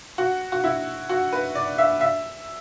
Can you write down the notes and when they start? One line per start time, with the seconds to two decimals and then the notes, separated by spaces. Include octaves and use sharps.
0.18 F#4
0.52 F#4
0.64 E4
1.09 F#4
1.33 B4
1.55 D5
1.78 E5
2.01 E5